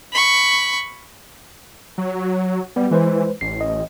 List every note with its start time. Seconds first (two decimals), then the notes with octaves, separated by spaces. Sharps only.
0.13 B5 C#6
1.98 F#3
2.76 G3 B3
2.91 E3 G#3 B4 C5
3.41 A1 C7
3.61 D#5